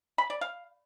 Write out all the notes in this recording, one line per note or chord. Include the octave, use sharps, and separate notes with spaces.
B5
D5
F5